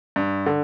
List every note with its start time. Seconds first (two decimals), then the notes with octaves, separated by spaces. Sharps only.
0.16 G2
0.46 D3